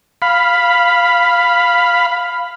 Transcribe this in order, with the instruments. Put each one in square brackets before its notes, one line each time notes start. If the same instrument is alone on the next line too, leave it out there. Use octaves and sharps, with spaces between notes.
[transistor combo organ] F5 B5